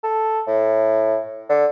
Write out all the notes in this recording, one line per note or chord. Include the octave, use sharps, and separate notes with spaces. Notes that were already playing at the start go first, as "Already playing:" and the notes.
A4
A2
D3